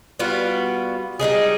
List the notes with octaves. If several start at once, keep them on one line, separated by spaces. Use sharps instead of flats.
G3 B3 F4 F#4
G3 A#3 D#4 G#4